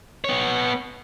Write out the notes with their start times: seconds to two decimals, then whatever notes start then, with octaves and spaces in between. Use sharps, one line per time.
0.24 B3 C#5